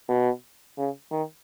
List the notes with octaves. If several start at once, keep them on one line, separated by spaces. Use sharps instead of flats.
B2
C#3
D#3